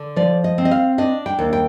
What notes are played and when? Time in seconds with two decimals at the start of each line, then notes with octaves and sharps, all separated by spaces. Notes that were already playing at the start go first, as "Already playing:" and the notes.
Already playing: D3
0.16 F3 D5
0.44 D#5
0.58 C4
0.65 D#5
0.71 F5
0.98 D4 D#5
1.26 G5
1.39 D#2
1.53 G5